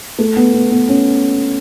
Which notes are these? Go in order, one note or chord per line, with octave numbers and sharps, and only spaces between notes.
A3
B3
B3
B3
C#4